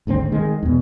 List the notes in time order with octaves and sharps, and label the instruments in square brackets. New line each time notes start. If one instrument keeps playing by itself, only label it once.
[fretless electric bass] G#1 D2 C3 C4
D#3 G#3
E2 B2